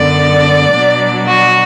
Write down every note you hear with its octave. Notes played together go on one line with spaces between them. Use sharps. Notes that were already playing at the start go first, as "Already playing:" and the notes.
Already playing: F#2 D3 B3 D5
B2 F#3 D4
F#4